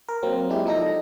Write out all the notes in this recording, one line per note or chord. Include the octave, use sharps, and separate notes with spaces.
A#4
F#3 A#3 C4
G#3 D4 E4 G4
F3 D#4 A4 A#6